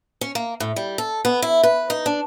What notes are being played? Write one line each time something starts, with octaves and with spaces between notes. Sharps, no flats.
C#4
A#3
A2
G3
A4
B3
E4
B4
D#4
D4